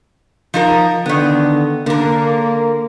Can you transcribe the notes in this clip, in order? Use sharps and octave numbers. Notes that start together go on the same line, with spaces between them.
F3 D#4 A#4
D3 D#3 B3
D3 A#3 A#4